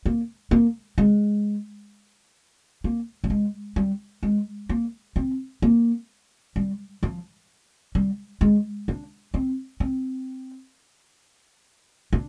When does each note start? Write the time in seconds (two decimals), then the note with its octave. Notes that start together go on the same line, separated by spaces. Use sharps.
0.06 A#3
0.51 A#3
0.98 G#3
2.84 A#3
3.24 G3
3.30 G#3
3.76 G3
4.23 G#3
4.69 A#3
5.16 C4
5.62 A#3
6.56 G3
7.03 F3
7.95 G3
8.41 G#3
8.88 D4
9.34 C4
9.80 C4
12.13 D4